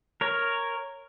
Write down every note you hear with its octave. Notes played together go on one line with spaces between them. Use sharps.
A#4 C#5